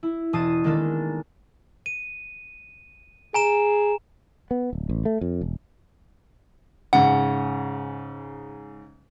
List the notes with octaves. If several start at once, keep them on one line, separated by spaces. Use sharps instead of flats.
E4
E1 A5 D#6 C7 D#7 E7
D#3 G#3 A#3 B3 D4 A4
D#7
G#4 G#5 A#5 E7
B3
D1
A1
A3
F2
E1
G#2 C#3 F#5